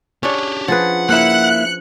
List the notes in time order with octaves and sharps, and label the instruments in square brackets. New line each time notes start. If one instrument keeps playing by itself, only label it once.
[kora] C#4 D4 C#5 [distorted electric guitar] G4 G#4
[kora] F3 G#4 B4 [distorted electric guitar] F#5
[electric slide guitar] A#3 E4 [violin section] F#6 C#7